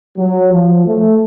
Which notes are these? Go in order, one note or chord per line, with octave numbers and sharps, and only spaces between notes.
F#3
F3
A3